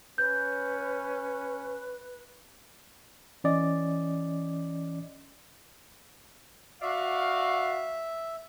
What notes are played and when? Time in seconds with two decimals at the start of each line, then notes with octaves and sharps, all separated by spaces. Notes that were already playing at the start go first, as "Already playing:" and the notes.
0.18 C#4 B4 G6
3.44 E3 C#4 D5 D#5
6.82 F#4 D5 E5 F5